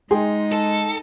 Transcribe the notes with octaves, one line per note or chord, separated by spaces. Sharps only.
G#3 D#4 G#4 G5 C6
A4